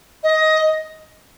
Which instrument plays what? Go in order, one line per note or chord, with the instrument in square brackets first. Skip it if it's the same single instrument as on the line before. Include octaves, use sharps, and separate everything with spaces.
[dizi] D#5